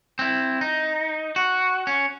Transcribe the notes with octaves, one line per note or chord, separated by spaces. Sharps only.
C4 E4
D#4
F#4
C#4